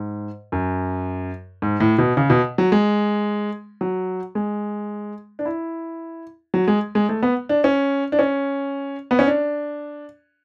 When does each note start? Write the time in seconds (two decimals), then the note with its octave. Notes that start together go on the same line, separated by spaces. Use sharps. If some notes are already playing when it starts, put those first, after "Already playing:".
Already playing: G#2
0.52 F#2
1.62 G#2
1.80 A2
1.98 B2
2.17 C#3
2.30 B2
2.58 F#3
2.72 G#3
3.81 F#3
4.35 G#3
5.39 D4
5.45 E4
6.54 F#3
6.68 G#3
6.95 G#3
7.09 A3
7.23 B3
7.49 D4
7.64 C#4
8.12 D4
8.19 C#4
9.11 B3
9.19 C#4
9.27 D4